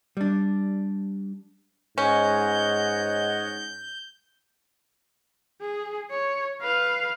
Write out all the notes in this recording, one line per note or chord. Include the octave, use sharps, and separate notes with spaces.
G3 D4
G#2 C#4 C#5 D#5 F#5 G6
G#4
C#5
B4 F5